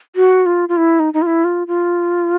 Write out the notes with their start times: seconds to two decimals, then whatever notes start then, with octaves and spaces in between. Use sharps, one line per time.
0.16 F#4
0.46 F4
0.69 F4
0.77 E4
1.00 D#4
1.14 D#4
1.22 F4
1.27 E4
1.45 F4
1.67 F4